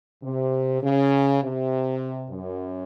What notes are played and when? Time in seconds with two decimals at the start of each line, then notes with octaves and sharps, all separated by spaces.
0.22 C3
0.82 C#3
1.42 C3
2.31 F#2